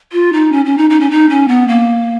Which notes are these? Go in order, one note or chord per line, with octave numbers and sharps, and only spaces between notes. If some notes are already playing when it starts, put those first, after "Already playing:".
F4
D#4
C#4
C#4
D#4
D#4
C#4
D#4
C#4
B3
A#3